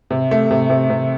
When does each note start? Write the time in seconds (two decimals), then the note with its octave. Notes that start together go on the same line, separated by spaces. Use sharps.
0.11 C3
0.31 A3
0.51 C3
0.70 C3
0.90 C3